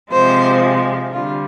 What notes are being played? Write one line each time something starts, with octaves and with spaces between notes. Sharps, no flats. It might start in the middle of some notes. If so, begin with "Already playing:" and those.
C3 F3 G#3 C5
D3 G3 F4